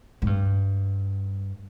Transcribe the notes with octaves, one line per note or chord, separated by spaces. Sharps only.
G#2
G2